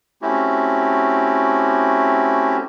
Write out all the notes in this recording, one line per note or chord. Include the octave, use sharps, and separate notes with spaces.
A3 C4 C#4 E4 F#4 G4